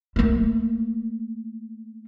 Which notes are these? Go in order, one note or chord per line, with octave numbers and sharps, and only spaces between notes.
A3 A#3